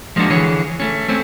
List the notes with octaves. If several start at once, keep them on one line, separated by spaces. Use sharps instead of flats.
F3 G#3 A#3 D4 F#4
D3 E3 G#4 C#5
A3 C#4
A3 C4 C#4